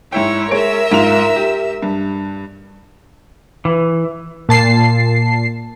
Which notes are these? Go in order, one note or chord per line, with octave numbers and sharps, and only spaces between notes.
G#2 E4 C#5 E5 G5
G#3 A#4 C#5 E5 E6 D7
G#2 F4 F7
G4
G2
E3
A#2 A5 C7